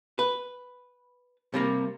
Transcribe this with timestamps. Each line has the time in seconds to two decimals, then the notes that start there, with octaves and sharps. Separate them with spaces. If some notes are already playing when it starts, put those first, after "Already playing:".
0.19 B4
1.54 C3 G3 A#3